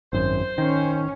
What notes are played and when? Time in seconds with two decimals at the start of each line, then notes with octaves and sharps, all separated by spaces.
0.13 G#1 F#2 C5
0.58 D#3 C#4